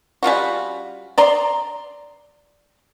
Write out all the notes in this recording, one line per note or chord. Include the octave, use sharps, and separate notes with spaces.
G3 C#4 F4 F#4
D5 A#5 C6